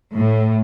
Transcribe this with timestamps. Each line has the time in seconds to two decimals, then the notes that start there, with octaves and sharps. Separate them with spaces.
0.15 A2